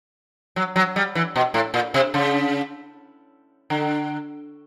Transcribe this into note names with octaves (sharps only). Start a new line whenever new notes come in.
F#3
F#3
G3
E3
B2
A2
A#2
C3
C#3
D3